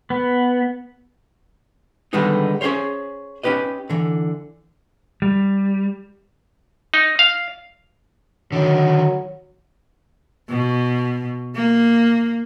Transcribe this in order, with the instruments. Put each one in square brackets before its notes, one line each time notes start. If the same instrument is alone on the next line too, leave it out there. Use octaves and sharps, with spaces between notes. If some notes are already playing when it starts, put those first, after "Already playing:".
[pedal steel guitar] B3
[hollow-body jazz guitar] D3 D#3 G3 G#3 B3 D#4
C#4 G#4 A#4 C5 C#5
C#4 D#4 G4 B4 D#5
D3 E3
[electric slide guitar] G3
[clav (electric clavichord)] D#4
F5
[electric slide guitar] D3 D#3 [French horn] F#3
[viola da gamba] B2
A#3